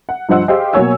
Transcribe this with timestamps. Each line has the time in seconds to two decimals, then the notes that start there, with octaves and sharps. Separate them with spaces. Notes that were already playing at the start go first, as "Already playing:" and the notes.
0.09 F#5
0.29 G2 F3 C5 D#5 F#5 E6
0.48 G4 G#4 C5 D#5 F5 G5
0.73 B2 F#3 A#3 C#5 G#5 E6